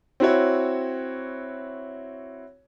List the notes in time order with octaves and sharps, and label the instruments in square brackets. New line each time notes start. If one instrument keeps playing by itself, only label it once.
[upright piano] C4 E4 F#4 C#5